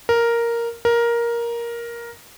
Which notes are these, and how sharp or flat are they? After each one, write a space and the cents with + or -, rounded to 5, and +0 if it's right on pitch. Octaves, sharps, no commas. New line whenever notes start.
A#4 +0
A#4 +10